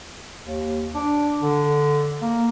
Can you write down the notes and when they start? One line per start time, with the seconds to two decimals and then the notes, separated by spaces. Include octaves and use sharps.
0.43 D#2
0.95 D4
1.41 D3
2.22 A#3